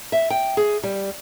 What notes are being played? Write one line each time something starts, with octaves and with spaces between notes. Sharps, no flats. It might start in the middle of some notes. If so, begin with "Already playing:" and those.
E5
G5
G#4
G3